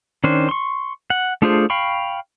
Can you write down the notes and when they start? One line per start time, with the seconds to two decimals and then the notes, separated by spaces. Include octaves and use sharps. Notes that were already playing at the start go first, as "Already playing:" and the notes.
0.24 D#3 C#4 D4 C5
0.49 C6 C#6
1.10 F#5
1.42 A3 D4 F4 G#4 C5
1.70 F5 G5 B5 C#6